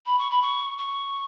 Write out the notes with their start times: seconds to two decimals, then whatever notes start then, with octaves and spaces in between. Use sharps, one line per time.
0.06 B5
0.18 C#6
0.30 B5
0.42 C#6
0.78 C#6